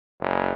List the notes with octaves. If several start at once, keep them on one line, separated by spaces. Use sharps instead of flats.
F#1